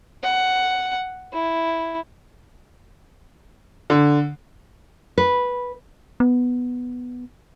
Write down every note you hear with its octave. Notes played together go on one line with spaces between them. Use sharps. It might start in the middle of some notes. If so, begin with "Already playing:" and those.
F#5
E4
D3
B4
B3